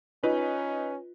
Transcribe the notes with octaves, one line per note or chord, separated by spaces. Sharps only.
C#4 D#4 F4 B4